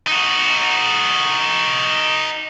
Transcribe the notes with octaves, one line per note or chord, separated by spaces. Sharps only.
D#4 F#4